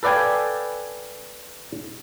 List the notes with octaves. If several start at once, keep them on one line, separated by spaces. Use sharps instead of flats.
A4 B4 D5 F5 G5 G#5